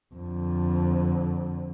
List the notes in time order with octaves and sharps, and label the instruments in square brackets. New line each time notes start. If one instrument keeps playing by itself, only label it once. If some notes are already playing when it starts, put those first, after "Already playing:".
[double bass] F2 D3